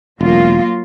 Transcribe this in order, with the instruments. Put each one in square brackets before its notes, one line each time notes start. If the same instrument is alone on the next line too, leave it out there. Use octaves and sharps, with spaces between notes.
[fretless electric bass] E1 [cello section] F#3 A#3 F4